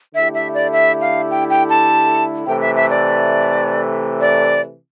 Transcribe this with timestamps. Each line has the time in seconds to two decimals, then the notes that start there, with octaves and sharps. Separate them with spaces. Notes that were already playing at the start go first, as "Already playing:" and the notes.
0.15 D3 A3 E4 G4 E5
0.34 E5
0.54 D5
0.72 E5
1.01 F5
1.31 G5
1.50 G5
1.70 A5
2.46 C3 E3 A3 G5
2.61 E5
2.76 E5
2.90 D5
4.21 D5